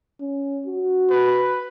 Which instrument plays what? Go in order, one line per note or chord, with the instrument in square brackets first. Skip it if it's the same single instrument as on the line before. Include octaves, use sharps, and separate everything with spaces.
[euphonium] C#4
F#4
[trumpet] B4